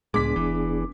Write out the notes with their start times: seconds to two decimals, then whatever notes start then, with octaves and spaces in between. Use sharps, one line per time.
0.14 C#2 A2 G#3 B3 D4 G#4 D6 B6
0.36 F1 E3